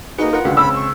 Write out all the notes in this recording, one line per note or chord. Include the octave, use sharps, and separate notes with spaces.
A#3 D#4 F#4 G#4 B4 C#7
F4 A#4 B4 F#5
C#2 D3 F#4
C#2 C4 C#4 B5 E6
C#6